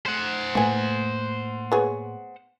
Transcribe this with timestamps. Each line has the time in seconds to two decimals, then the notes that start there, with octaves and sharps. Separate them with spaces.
0.06 C5 F#5
0.55 A2 E3 A3 A#3 G#5
1.72 B3 G#4 C#5